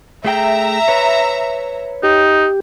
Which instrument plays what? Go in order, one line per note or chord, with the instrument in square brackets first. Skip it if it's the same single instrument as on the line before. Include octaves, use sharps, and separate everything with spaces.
[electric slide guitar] A3 G#4 G5 [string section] E5 A#5
[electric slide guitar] B4 C#5
[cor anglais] D#4 [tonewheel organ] G4